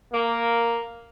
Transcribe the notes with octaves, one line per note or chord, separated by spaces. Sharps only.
A#3